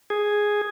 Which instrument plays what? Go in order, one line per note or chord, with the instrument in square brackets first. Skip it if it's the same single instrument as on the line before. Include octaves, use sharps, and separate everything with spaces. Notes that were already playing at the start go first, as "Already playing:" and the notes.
[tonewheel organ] G#4